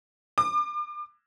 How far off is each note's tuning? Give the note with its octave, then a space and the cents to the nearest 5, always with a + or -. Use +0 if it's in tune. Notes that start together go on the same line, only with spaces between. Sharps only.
D6 +35